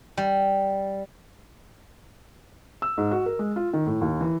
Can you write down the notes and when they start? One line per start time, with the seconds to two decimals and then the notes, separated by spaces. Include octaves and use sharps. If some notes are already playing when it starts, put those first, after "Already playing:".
0.17 G3
2.82 E6
2.98 G#2
3.11 F#4
3.26 A#4
3.39 G#3
3.56 F4
3.73 D#3
3.87 A2
4.01 D#2
4.21 E3